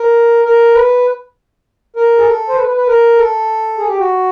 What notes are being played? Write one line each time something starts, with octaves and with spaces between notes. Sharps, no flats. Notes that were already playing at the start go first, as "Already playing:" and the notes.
Already playing: A#4
A#4
B4
A#4
G#4
A4
C5
B4
B4
B4
A#4
A4
G#4
G4
F#4